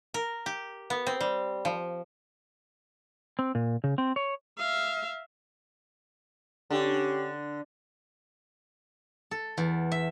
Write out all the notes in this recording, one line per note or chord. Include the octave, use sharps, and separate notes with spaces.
A#4
G4
B3
C4
G3
F3
C4
A#2
C#3
C4
C#5
E5 F5
D3 C#4 G4
A4
E2
E5